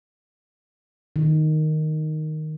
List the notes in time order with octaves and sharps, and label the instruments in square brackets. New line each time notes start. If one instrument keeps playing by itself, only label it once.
[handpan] D#3